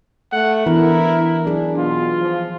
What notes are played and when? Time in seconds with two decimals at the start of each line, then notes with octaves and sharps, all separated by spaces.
0.32 A3 F#5
0.66 E3 B3 D4 E4 A#4
1.45 F#3 D4 G#4
1.78 B2 F4
2.21 F3